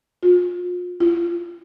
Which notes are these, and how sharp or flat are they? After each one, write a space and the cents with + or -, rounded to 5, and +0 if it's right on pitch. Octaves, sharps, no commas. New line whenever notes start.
F4 +35
F4 -35